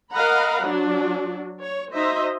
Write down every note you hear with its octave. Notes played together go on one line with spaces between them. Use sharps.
A#4 D#5 F5 F#5 A#5 B5
F#3 D4 F#4
C#5
D#4 F#4 C5 D#5 E5